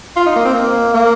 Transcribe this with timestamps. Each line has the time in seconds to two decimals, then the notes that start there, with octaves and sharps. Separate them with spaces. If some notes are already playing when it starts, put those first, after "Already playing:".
0.16 F4
0.26 D#4
0.36 A#3
0.45 C4
0.54 A#3
0.94 A#3